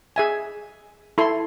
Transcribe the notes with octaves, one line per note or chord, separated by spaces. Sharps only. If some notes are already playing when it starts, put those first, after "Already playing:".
G#4 E5 G#5
E4 A4 C6